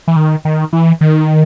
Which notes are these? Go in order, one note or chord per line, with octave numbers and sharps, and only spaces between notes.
E3
D#3
D#3
E3
D#3